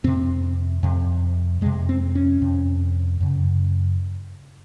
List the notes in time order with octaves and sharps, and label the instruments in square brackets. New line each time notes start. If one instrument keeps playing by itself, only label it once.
[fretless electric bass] F2 C3 C4
F2 C3
F2 G#3
C3
C4
C#4
F2 C3
F#2 C#3